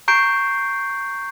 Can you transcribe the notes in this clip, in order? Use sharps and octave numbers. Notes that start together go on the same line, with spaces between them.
A#5 C#6 G6 C7 D7